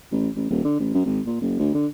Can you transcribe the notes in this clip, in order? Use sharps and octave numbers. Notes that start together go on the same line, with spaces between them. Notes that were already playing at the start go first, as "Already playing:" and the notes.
A1
A1
D#1
D3
A1
F#2
G#1
A#2
F#1
D2
D3